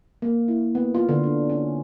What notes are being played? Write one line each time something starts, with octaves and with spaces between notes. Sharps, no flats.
A#3
E4
B3
F4
D3
D4
C#4